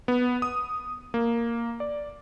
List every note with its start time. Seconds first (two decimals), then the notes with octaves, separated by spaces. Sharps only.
0.08 B3
0.42 D#6
1.14 A#3
1.80 D5